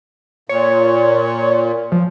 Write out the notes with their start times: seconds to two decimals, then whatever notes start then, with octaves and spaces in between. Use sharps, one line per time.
0.49 A#2 C#5
1.92 F3